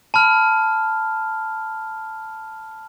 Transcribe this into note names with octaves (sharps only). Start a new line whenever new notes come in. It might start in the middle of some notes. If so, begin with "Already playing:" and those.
A5 B5 F6